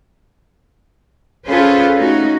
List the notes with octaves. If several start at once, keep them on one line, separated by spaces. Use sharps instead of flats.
C#4 F4 G#4 A4 B4 C5
A3 C#4 D#4 F#4